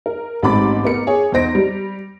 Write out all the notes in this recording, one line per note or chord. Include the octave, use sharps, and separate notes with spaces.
A#4
A1 G#2 C4 B5 D6 A6
B3 A#4 C#7
G#4 C#5
E2 D#4 C5 A#6 D7
G3